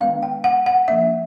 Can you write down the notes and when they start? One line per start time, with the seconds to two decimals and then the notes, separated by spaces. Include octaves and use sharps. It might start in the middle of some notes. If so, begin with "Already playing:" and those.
0.01 D#3 G#3 B3 D4 F5
0.23 G5
0.44 F#5
0.66 F#5
0.88 F3 A#3 D4 E5